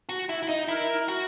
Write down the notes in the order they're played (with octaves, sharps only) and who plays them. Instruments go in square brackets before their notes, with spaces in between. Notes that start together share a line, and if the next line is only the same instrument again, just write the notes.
[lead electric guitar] F#4
E4
E4
D#4
[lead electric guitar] E4 [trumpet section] A#4
[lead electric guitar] F#4